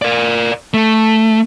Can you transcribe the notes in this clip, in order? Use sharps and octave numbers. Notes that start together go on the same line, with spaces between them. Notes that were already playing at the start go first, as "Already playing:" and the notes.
A#4 D5
A3